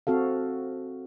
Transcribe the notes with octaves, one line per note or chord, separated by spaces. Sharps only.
C4 F#4 A4 F5